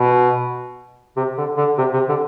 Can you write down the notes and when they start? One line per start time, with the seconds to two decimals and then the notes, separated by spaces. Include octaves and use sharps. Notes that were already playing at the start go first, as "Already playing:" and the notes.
Already playing: B2
1.17 C3
1.37 D3
1.57 D3
1.78 C3
1.93 C3
2.09 D3